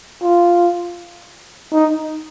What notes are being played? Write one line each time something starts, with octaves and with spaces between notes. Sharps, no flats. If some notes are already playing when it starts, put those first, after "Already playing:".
F4
D#4